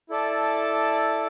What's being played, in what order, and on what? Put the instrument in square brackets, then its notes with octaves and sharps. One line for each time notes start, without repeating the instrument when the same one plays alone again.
[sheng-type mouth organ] E4 A4 D5 A5